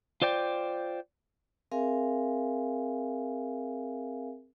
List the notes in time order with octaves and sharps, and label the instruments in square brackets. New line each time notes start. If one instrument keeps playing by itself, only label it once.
[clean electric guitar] F4 C5 D5 G5
[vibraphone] C4 G#4 A#4 E5 F5 G#5